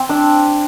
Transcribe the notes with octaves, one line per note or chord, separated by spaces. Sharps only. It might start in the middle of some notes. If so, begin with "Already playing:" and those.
Already playing: C4
D4